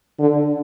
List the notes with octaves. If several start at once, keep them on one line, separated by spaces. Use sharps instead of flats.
D3